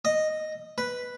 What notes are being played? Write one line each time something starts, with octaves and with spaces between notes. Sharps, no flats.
D#5
B4